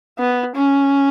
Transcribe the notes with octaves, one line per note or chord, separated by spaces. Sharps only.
B3
C#4